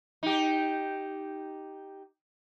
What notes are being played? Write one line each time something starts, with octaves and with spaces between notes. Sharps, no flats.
D#4 G4